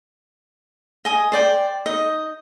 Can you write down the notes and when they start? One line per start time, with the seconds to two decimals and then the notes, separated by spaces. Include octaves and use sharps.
1.05 D#5 G#5 D#6
1.32 C5 D5 G5
1.86 D#4 D#5